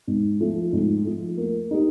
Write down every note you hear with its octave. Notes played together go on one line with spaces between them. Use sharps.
G#2
F3 A3
G#2
F3 A3
A#3
D#4 G4